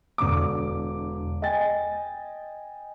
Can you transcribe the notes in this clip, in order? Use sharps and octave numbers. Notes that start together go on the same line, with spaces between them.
E1 D3 D6
D#5 G5 G#5 A6